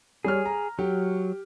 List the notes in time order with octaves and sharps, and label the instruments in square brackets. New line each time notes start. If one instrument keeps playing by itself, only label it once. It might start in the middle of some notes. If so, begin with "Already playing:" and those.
[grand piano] G3 C#5 F6 [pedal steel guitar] G#4
[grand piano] A#5
[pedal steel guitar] F#3 [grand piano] G4